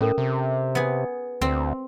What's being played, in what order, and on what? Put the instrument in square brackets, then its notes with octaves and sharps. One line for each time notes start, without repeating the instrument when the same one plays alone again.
[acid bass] A2 [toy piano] C#4 A4 A#4
[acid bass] C3
[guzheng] B3 G#4
[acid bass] D2 [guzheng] C4